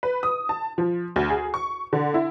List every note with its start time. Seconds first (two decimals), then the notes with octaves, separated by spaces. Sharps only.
0.03 B4
0.23 D#6
0.49 A5
0.78 F3
1.16 D2
1.30 G#4
1.54 C#6
1.93 D3
2.14 E4